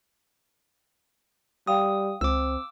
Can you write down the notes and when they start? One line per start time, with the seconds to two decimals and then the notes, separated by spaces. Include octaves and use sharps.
1.67 G3 F5 G5 D#6
2.21 C#2 C4 D6 E6